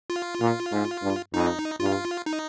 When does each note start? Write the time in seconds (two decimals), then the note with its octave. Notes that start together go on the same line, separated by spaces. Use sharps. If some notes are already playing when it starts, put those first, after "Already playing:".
0.10 F4
0.40 A#2
0.71 G#2
1.02 G2
1.33 F2 D#4
1.80 G2 F4
2.26 D#4